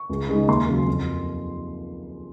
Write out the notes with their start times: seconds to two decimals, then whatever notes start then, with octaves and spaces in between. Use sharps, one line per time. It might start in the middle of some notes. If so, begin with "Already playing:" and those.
Already playing: C#6
0.09 C#2
0.29 C#3 G#3 D#4
0.48 D#2 C6
0.69 C#3 F#3
0.87 F2